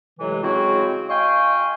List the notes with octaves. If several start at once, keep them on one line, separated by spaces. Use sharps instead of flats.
A2 C3 E3 F#3 G#3
C#3 G#3 C4 E4 F#4
D#5 F5 G5 G#5 C6 C#6